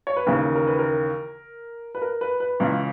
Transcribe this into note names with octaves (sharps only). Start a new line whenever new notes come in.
C#5
B4
D#2 C#3 E3 A#4
A#4
B4
A#4
B4
A#4
B4
B4
C#2 C#3 E3